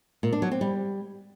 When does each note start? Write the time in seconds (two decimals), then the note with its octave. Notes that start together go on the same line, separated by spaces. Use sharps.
0.23 A#2
0.33 D4
0.42 F#3
0.51 C4
0.61 G3